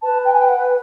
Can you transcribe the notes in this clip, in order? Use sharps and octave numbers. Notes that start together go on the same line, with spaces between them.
B4 A5
G5
G#5
G5
F#5